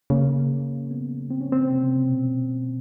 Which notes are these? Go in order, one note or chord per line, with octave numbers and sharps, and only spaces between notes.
C#3 A#3
B3
C4
C#4
C4
C3
B2